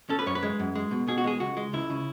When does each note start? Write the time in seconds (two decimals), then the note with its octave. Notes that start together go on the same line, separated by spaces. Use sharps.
0.09 C#4 A4
0.19 B4
0.26 F#2 C#5
0.35 B4
0.43 G#3
0.60 F#2
0.75 G#3
0.91 B2
1.08 B2 G#4
1.18 F#4
1.24 G#3 G#4
1.40 C#2 F#4
1.57 G#3
1.73 C#2 E4
1.90 C#3